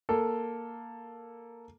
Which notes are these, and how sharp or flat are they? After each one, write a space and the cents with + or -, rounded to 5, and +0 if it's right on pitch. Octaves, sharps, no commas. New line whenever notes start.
A#3 +0 A4 +0